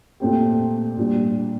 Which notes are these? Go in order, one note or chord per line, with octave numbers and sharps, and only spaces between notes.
A#2 A3 C4 G4
A#2 G3 D4